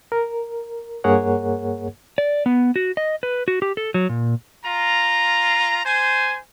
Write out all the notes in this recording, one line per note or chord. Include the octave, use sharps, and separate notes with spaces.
A#4
G2 A#3 G#4 A#4 C#5 F#5
D5
B3
F#4
D#5
B4
F#4
G4
A4
F#3
A#2
F4 A#5
C5 G#5